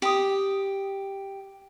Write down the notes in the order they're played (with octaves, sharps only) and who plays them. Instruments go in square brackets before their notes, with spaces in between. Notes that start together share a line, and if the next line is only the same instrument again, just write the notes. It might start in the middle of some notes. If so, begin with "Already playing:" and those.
[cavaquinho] G4 D#6